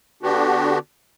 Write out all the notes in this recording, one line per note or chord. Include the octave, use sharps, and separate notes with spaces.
D3 B3 D4 F#4 G4